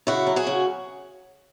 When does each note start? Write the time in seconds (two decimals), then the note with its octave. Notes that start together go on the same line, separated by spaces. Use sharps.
0.07 C#3 E4 F#4
0.27 F#3
0.36 F#4 G#4
0.47 C#3